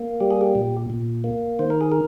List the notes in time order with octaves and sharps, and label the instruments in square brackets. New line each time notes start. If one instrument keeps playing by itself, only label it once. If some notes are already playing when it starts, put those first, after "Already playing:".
Already playing: [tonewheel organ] A#3
G3 G4
G#4
G4
A#2
A#2
A#3
D#3 C5
A#4
G#4
A#4